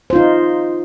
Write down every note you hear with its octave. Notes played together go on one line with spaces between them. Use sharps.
D#4 F4 C5